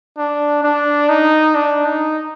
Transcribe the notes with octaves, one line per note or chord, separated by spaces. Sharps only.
D4
D4
D#4
D4
D#4